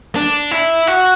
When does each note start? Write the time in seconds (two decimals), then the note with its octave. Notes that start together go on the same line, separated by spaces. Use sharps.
0.16 D4
0.51 E4
0.87 F#4